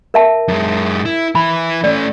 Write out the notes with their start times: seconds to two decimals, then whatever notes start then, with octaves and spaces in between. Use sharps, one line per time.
0.14 A#4 E5 A5
0.48 F#2 G#3
1.05 E4
1.35 E3 E4 B5
1.84 A3 C#4 D5